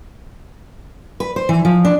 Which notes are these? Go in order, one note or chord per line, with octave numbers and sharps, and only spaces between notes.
B4
C5
E3
F3
D4